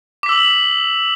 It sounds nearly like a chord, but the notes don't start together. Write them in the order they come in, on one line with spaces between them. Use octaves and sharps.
D6 B6 E6 F#7